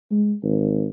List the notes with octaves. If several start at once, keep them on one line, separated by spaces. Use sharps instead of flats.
G#3
G#1